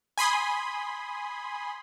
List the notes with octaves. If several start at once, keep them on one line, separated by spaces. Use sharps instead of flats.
G#5 B5 C6 D#6